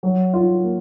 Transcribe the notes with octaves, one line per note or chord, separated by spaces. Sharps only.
F#3
F4
A#3